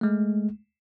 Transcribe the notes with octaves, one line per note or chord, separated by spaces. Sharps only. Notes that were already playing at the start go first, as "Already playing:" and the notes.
G#3 A3